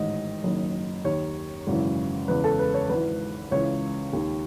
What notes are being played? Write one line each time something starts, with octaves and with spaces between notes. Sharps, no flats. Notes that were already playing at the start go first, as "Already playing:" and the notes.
Already playing: A1 G#2 D#3 D#5
F#1 F#2 D#3
D#2 D#3 C#5
G#1 F#2 C#3 E3
E1 E2 C#3 B4
A4
B4
C#5
G#1 G#2 E3 B4
C#2 C#3 E3 C#5
D#2 D#3